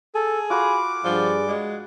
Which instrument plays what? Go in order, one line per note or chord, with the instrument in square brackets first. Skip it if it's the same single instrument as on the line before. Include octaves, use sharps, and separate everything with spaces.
[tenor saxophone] G#4 [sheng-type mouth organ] A4
[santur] F4 F#4 B5 [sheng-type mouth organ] D6
[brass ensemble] G2 G#4 D5 [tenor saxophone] F3 [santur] F#5
[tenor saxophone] G#3